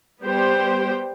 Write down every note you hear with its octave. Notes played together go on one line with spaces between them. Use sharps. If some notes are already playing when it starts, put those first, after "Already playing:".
G3 B3 G4 C5 G5